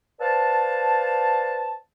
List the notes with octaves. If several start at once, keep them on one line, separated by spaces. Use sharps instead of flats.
B4 C5 D5 F5 A5